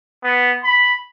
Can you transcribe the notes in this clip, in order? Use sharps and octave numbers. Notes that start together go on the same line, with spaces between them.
B3
B5